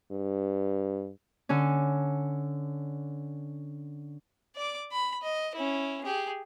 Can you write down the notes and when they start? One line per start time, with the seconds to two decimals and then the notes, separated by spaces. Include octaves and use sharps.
0.12 G2
1.49 D3 C#4
4.55 D5 D6
4.92 B5
5.23 D#5
5.56 C#4 E4
6.04 G4 G#4